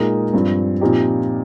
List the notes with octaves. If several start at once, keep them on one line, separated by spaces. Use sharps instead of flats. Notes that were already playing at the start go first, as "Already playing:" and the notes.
Already playing: A#2 G#3 D#4 A#4
G2 F3 C4
A#2 F3 C4 D#4 G4